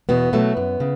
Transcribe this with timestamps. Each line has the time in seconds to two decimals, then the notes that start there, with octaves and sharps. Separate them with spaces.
0.09 E2 B2 B3
0.33 B2 F#3 A3
0.57 F#2
0.80 C#3